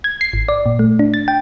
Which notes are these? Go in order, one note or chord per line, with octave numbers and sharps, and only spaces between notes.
G#6
C7
G#1
D5
A#2
A3
D4
A6
G5